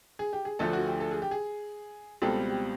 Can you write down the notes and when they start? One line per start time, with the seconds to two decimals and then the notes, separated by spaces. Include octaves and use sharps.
0.19 G#4
0.33 G4
0.45 G#4
0.59 D2 D3 F3 A3 A4
0.73 F#4
0.86 G4
1.00 A4
1.11 G#4
1.22 G4
1.31 G#4
2.22 C#2 B2 G3 C4 A4
2.50 G4